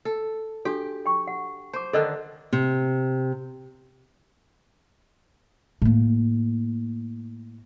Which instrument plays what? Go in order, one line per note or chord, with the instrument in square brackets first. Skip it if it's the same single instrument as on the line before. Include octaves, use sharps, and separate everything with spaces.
[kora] A4
[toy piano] D4 F#4 A4 [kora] G4
[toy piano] G5 C#6
F#5
[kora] C5 [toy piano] A5 D6
[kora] D3 D#3 D4 [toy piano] A4 D#5 E6
[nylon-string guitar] C3
[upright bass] A2 A#3